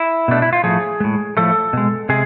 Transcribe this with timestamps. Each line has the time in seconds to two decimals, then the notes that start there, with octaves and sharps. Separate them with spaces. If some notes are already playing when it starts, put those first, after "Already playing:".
Already playing: E4
0.28 B2 A3 D4
0.42 E4
0.53 F4
0.64 A2 F3 A3 G#4
1.00 A2 G#3
1.37 A2 F3 A3 A4
1.73 B2 G#3
2.09 C3 G#3 G#4